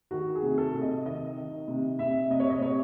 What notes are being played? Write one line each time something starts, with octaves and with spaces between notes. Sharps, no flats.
D#3 F#4
G#4
C3
A4
C3
D#5
D#3 D#5
D#3
C3
C3 E5
C3 D#5
C#5
D#5
C3 C#5